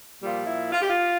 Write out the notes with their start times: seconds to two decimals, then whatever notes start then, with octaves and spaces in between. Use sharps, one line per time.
0.21 A#2 F3 G3
0.46 E4
0.72 F4
0.81 G4
0.89 F4